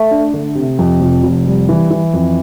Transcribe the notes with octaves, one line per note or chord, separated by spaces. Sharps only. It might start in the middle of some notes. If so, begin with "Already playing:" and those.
Already playing: A3
D4
D3
C3
F2
F1
F1
G3
E3
E3
F2